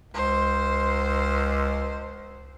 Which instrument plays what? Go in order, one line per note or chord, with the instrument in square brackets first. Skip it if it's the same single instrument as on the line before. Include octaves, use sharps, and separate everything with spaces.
[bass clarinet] C#2 [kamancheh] C5